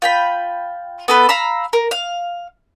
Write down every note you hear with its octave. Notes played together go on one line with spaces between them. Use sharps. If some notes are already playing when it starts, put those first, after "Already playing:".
F4 G5 B5
B3 A4 B4
F5 A#5 B5 E6
A#4
F5